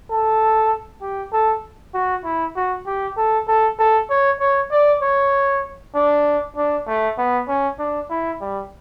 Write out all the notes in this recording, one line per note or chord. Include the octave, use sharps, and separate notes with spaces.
A4
G4
A4
F#4
E4
F#4
G4
A4
A4
A4
C#5
C#5
D5
C#5
D4
D4
A3
B3
C#4
D4
E4
G3